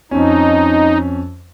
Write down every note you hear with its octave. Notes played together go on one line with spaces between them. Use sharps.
F2 C#4 D#4